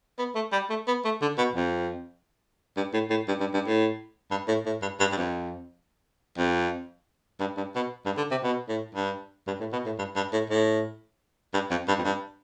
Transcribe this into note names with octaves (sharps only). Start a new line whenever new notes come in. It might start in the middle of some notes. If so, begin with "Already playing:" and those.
B3
A3
G3
A3
B3
A3
D3
B2
F2
G2
A2
A2
G2
G2
G2
A2
G2
A2
A2
G2
G2
G2
F2
F2
G2
G2
B2
G2
D3
C3
B2
A2
G2
G2
A2
B2
A2
G2
G2
A2
A2
G2
F2
G2
F2
G2